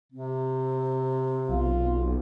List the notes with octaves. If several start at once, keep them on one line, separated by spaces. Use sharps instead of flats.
C3 C4
B1 F4